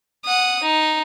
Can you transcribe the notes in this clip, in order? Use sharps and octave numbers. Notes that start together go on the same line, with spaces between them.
F#5 D#6
D#4